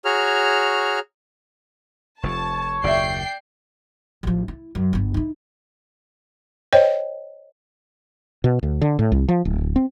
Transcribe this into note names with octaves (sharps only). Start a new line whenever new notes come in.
F#4 G#4 C#5 A#5 F6
F1 F2 C#5 A5
F#1 D#2 D5 E5 G5 G6 C7
A1 F3
E4
F#2
G1 B3
D#4 E4
C5 C#5 D#5 G5
B2
D2
D3
A2
C2
F3
D1
C4